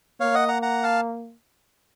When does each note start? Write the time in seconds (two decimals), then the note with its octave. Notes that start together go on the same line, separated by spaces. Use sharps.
0.20 A#3 C#5 F5
0.34 D#5 F#5
0.48 F#5 A#5
0.62 F#5 A#5
0.83 F5 A5